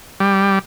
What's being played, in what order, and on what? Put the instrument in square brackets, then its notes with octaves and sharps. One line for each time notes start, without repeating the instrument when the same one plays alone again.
[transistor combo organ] G3